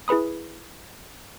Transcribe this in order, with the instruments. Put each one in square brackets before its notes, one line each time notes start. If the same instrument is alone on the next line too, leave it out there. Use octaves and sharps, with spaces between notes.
[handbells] E4 G#4 B4 B5 D#6